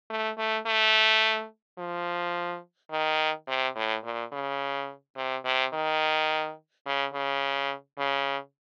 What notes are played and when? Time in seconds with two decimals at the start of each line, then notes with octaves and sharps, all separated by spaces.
0.10 A3
0.38 A3
0.66 A3
1.78 F3
2.91 D#3
3.48 C3
3.75 A2
4.04 A#2
4.32 C#3
5.16 C3
5.45 C3
5.73 D#3
6.86 C#3
7.13 C#3
7.98 C#3